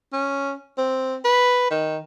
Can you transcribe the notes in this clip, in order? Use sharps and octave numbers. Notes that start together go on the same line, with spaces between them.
C#4
C4
B4
D#3